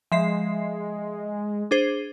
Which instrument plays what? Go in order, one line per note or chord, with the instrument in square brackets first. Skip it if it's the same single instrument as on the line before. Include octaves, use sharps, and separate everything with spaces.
[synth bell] F3 E5 C7 [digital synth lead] G#3
[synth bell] D4 G#4 C5